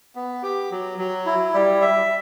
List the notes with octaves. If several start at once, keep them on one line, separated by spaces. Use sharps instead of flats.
B3
G4
F#3
F#3
E4
G3
E5